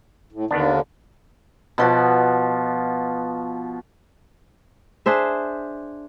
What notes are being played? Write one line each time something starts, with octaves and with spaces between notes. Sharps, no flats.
A2
D#2 D3 D#3 B3 D4
B2 F3 F#4
D4 G#4 C5 E5